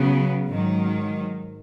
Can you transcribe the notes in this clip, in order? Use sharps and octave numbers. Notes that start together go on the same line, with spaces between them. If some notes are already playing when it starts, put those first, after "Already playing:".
Already playing: C#3 F#3 B3
G#2 D#3 F#3